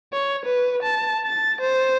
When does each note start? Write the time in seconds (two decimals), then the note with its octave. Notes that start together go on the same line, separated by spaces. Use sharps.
0.13 C#5
0.45 B4
0.83 A5
1.26 A6
1.61 C5